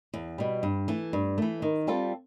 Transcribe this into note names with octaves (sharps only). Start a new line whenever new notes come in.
E2
B2 G3
G2
E3 A3
G2
E3 A3
D#3
G3 C4 F4 A4